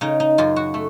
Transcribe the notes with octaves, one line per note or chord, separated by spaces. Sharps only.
C#3 D#4
D#4
F#2 F4
F#4
A3